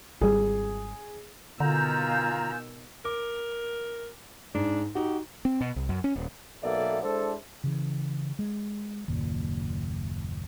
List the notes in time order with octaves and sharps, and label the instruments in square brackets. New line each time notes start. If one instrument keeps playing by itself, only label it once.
[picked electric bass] G#1 G3 [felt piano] G#4
[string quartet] B2 D#3 E6 [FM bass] D3 [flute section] F4 G#5 G6 [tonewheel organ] A#5
[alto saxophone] A#4 [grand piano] D6
[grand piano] G#2 [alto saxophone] D4
[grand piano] D#4 F#4 [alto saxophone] G4
[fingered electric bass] C4
B2
C2
F#2
C#4
D#1
[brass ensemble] B1 A#3 B3 A4 D5 E5
G#3 D4 E4 A4 C5
[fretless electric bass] C#3 E3
G#3
F#1 D#2 A#2